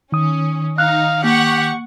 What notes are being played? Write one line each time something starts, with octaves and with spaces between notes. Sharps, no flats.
D#3 C#4 D#6
D#4 F5 F#6
A#3 G4 F#5 C#6